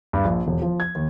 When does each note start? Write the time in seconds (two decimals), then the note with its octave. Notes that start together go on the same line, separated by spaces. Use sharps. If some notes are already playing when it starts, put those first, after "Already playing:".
0.13 G2
0.24 A#1
0.47 E1
0.62 F3
0.80 G#6
0.95 D#2